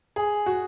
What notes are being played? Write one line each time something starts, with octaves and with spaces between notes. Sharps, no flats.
G#4
F#4